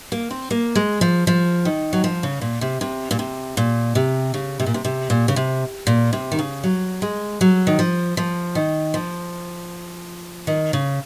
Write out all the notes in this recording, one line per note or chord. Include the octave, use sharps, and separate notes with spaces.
A#3
C4
A#3
G#3
F3
F3
D#3
F#3
F3
C#3
A#2
C3
C3
A#2
C3
A#2
C3
C#3
C3
A#2
C3
C3
A#2
C#3
C3
A#2
C3
D#3
C#3
F#3
G#3
F#3
D#3
F3
F3
D#3
F3
D#3
C#3